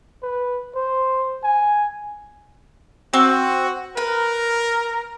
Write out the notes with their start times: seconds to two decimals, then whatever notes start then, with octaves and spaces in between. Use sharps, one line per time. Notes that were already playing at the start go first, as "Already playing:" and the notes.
0.23 B4
0.76 C5
1.44 G#5
3.13 C4 F#4
3.97 A#4 B4